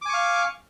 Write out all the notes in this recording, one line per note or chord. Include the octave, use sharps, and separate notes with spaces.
F5 G#5 C#6 D6